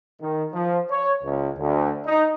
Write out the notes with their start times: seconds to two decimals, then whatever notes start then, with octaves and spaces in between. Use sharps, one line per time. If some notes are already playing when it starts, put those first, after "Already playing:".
0.21 D#3
0.53 F3
0.90 C#5
1.23 C#2
1.58 D2
2.06 D#4